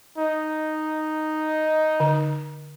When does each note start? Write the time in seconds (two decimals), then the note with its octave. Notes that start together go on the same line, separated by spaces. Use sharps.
0.18 D#4
2.00 D3